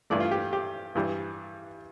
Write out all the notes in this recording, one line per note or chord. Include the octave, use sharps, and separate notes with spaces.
G2 E3 A3 D5
F4
G4
G4
G2 E3 G3